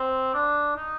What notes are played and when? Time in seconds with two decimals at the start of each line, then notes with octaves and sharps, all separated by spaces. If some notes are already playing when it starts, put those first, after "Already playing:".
Already playing: C4
0.34 D4
0.77 D#4